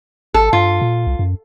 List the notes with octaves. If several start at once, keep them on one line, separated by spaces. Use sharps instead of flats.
G#1 A4
G2 F4
A#2
C2
F#2